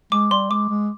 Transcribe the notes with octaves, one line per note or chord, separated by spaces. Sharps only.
G#3 D6
G3 C6
G#3 D6
G#3